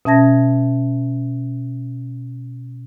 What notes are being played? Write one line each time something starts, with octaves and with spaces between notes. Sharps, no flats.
B2 C#4 E5 A5 G#6 A#6